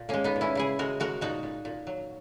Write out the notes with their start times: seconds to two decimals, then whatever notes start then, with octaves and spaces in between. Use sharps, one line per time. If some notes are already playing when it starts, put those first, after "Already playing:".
Already playing: A#2
0.09 G#3 A#3 C#4
0.24 B3 D#4
0.36 A#2
0.41 C#4 E4
0.55 C#3 E4 G#4
0.79 G#3 F#4 A#4
1.00 G#3 F#4 A#4
1.21 A#2 D#4 F#4
1.43 A#2
1.65 A#2
1.87 F#3